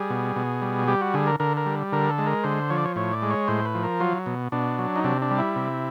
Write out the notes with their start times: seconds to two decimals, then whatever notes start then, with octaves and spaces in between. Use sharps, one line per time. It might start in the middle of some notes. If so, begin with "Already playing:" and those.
Already playing: G3 G#4
0.10 B2
0.36 B2
0.62 G3
0.87 G3 G4
1.01 F#4
1.14 D3 G#4
1.27 A#4
1.40 D3 A#4
1.57 A#4
1.66 G3
1.92 D3 A#4
2.09 A4
2.18 G#3
2.26 A#4
2.44 D3 C5
2.70 F3 C#5
2.77 D5
2.85 C#5
2.96 A2 C#5
3.13 D5
3.22 G#3
3.30 C#5
3.48 A2 C5
3.65 B4
3.75 F3
3.83 A#4
4.00 F#3 F4
4.26 B2
4.52 B2 D4
4.79 F#3
4.96 D#4
5.04 C3 D4
5.22 D4
5.31 G3
5.38 E4
5.56 C3